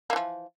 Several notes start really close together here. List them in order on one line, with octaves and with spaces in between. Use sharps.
A#3 E3 F3